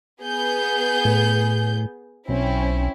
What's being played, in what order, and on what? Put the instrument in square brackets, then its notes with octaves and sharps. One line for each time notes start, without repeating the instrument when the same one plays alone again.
[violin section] B3 G#4 G6
[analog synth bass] A2
[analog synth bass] B1 [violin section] C4 C#4 E4